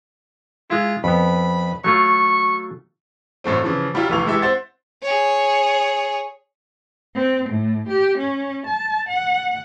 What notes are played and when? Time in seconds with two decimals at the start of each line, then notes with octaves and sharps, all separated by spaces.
0.70 G#3 E4 F4
1.04 F2 B3 B5
1.84 F#3 A3 F4 C#6
3.44 A1 F#2 A3 C4
3.64 C#3 E3 F3
3.94 F#3 G3 E4 F4 G4
4.10 F1 E3 A3 F5 F7
4.26 E3 G#3 E4 G4 A4 E5
4.42 C4 C5 E5 F#5 C6 A6
5.02 G#4 C#5
7.15 C4
7.50 A2
7.89 G4
8.19 C#4
8.67 A5
9.09 F#5